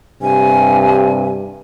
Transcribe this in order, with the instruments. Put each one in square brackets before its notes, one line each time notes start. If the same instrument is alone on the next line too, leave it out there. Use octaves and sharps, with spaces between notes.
[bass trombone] G2 [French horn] C3 [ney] G#5